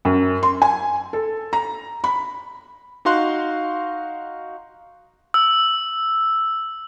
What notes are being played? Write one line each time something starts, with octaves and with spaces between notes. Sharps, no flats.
F#2
C6
G#5
A4
A#5
B5
D#4 F#4 F5 C6 F#6
E6